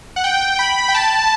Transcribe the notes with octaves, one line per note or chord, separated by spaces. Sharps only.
F#5
G5
B5
G5
A5